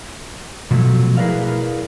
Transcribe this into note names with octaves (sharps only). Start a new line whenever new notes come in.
B2 F3 F#3 A3
E4 G#4 A#4 B4 D5 F5